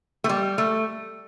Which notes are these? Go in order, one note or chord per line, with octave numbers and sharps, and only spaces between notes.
A3
G3
A3